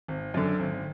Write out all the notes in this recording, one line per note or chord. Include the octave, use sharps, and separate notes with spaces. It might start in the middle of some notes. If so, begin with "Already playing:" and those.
G#1
F#2 D3
G#1